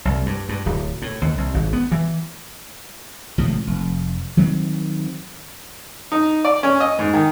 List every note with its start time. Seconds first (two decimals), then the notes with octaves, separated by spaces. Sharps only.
0.05 C2
0.26 G2
0.49 G2
0.66 D1
1.02 A2
1.22 D#2
1.38 C2
1.54 G#1
1.73 B3
1.91 E3
3.38 G#1 A2 C3 F3
3.67 F1
4.37 D#3 F#3 C4
6.12 D#4
6.45 D5
6.63 C#4
6.80 D#5
6.99 G#2
7.14 D#3